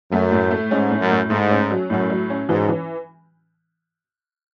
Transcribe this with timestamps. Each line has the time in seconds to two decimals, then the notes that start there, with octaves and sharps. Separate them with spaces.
0.12 F#2 A3
0.31 A2
0.51 A3
0.71 G#2 C#4
0.90 A2
1.01 F#2
1.11 A2
1.30 G#2 A3
1.50 C#4
1.70 F#3
1.90 F#2 A2
2.10 F#3
2.30 C#4
2.49 G#2 E3
2.69 E3